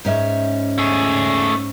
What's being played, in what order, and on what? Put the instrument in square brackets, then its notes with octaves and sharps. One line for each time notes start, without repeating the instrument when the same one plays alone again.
[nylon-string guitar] G#2 C#4 E5
[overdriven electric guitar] A3 G#4